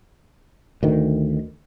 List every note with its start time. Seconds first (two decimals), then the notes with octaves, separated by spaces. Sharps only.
0.83 D2 D#3